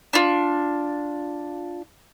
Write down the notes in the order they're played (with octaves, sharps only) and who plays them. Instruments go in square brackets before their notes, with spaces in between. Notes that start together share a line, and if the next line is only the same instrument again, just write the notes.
[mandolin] D4 F4